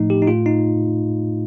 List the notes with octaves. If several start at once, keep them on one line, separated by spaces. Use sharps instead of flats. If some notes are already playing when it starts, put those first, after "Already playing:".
Already playing: A2 F3 A3 D#4
G4
D#4
A2 A3 F4
D#4